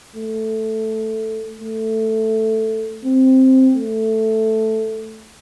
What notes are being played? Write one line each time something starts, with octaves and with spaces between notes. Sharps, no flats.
A3
A3
C4
A3